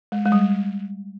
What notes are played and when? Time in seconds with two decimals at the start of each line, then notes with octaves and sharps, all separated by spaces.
0.12 G#3
0.25 G#3
0.32 G3